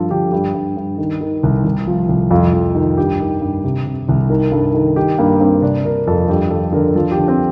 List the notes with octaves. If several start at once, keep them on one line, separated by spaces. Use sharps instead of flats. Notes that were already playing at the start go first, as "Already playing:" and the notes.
Already playing: G2 F3 F4 A4
D3 G4
G2 G4
G2
G2
D#3
D#3
C2
C2
F3
C2
F2 F4
F2
D#3
G2 G4
D#3
G2
C3
C3
C2
D#3 A#4
G2 A4
D#3
D#3 G4
G2 A#3
G2 C4
C3 D4
C3 A#4
F2 A4
G2 G4
F3 A4
D3 A#4
F3 A4
G4
D3
C4